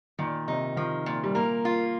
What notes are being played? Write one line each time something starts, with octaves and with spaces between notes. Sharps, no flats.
A#2 D#3
C3 D#4
D#3 F3
A#2
G3
A#3 A#4
F4